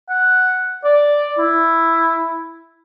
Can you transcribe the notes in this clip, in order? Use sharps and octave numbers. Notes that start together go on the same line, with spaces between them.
F#5
D5
E4